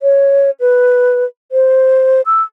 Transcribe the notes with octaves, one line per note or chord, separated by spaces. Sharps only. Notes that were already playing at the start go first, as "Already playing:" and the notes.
C#5
B4
C5
E6